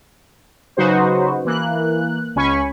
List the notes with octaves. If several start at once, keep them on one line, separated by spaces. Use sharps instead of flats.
C#3 F#3 D#4 F#4 B4 C5
E3 A#3 F#6
C#2 C#4 G#5 B5 C#6